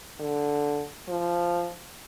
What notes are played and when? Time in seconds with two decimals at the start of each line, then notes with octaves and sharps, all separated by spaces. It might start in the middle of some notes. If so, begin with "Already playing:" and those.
0.20 D3
1.08 F3